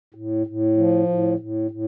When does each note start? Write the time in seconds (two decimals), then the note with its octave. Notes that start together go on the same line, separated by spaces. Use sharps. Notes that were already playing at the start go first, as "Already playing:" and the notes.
0.14 A2
0.47 A2
0.77 F3
1.08 A2
1.39 A2
1.71 A2